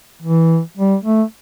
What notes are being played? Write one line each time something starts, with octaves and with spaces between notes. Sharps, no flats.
E3
G3
A3